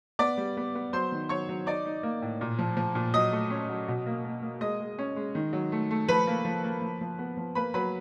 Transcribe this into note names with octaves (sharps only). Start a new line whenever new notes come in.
B3 D5 D6
G3
B3
B3
F#3 C5 C6
D#3
F#3 C#5 C#6
F#3
D#4 D5 D6
D#4
A#3
A2
A#2
F3
F3
A#2
F#3 D#5 D#6
A3
C#4
F#3
B2
A#3
A#3
A#3
G#3 D#5 D#6
G#3
C#4
G#3
D#3
F#3
A3
A3
F3 B4 B5
A#3
F3
A#3
F3
F3
B3
F3
A#3 B4 B5
F#3 B4 B5